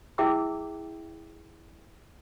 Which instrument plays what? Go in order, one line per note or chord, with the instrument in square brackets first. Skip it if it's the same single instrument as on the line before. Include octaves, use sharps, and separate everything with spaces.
[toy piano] E4 G#4 E5 G5 D6 E6